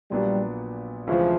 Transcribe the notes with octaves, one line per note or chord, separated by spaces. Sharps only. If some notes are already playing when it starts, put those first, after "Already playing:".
A#1 A#2 F#3 G3 B3 D4
D2 C3 E3 F3 G#3 C#4